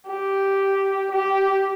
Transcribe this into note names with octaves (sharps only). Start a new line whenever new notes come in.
G4
G4